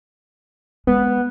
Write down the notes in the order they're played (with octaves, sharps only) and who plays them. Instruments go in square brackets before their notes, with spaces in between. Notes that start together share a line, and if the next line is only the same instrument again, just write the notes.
[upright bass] G#3 [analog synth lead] B3